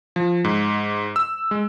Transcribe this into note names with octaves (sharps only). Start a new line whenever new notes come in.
F3
G#2
E6
G#3